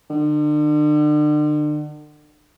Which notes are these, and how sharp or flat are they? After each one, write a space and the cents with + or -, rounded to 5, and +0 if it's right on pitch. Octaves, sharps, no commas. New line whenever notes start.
D3 +40